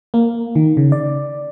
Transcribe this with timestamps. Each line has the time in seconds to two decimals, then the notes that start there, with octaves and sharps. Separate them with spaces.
0.14 A#3
0.56 D#3
0.77 C#3
0.92 D5